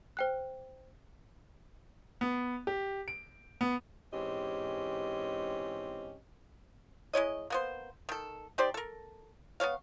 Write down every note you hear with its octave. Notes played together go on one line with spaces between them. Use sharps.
C5 G5 F#6
B3
G4
D7
B3
G#2 E3 C4 C#4 G4 D#5
G#3 E4 C#5 D#5
A#3 B3 C5
D#3 A4
D#4 G4 C5 D5
A4 A#4
B3 C#4 C#5 F5